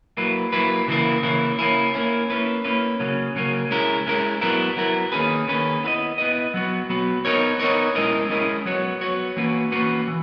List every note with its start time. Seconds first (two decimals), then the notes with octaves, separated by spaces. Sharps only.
0.17 F#3 A#3 E4 B4
0.52 F#3 A#3 E4 B4
0.88 C#3 E3 A#3 E4
1.23 C#3 E3 A#3 E4
1.59 A#3 C#4 E4
1.94 A#3 C#4 E4
2.30 A#3 C#4 E4 B4
2.64 A#3 C#4 E4 B4
3.00 C#3 F#3 A#3 C#4
3.36 C#3 F#3 A#3 C#4
3.71 G#3 C#4 E4 A#4
4.06 G#3 C#4 E4 A#4
4.41 F#3 B3 E4 A#4
4.77 F#3 B3 E4 A#4
5.12 D#3 A#3 C#4 G#4 B4
5.47 D#3 A#3 C#4 G#4 B4
5.83 B3 E4 B4 D#5
6.18 B3 E4 B4 D#5
6.54 F#3 B3 F#4
6.89 F#3 B3 F#4
7.25 B3 D#4 A#4 C#5
7.60 B3 D#4 A#4 C#5
7.95 G#3 C#4 E4 A#4 D#5
8.30 G#3 C#4 E4 A#4 D#5
8.66 F#3 B3 F#4 C#5
9.01 F#3 B3 F#4 C#5
9.36 E3 A#3 C#4 F#4 B4
9.72 E3 A#3 C#4 F#4 B4
10.08 E3